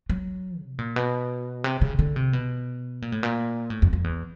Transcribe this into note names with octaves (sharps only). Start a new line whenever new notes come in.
F#3
C3
A#2
B2
C3
C#3
D3
C3
B2
A#2
A2
A#2
A2
F2
F2
E2